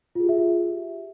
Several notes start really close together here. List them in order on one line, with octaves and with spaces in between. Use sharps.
F4 G#4 G4 E5